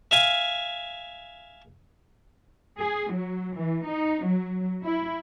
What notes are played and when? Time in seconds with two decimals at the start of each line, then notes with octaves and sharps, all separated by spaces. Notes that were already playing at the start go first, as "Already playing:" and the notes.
0.11 E5 F5 G#5
2.78 G#4
3.10 F#3
3.54 E3
3.86 D#4
4.23 F#3
4.83 E4